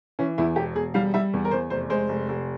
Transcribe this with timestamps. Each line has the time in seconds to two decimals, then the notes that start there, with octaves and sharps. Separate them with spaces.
0.19 E3 C#4
0.38 E2 E4
0.56 E1 G4
0.75 E1 G#4
0.94 G3 F5
1.14 G3 E5
1.33 E2
1.45 A#4
1.51 E2 C5
1.70 F1 C5
1.90 G#3 C5
2.09 F1
2.29 F1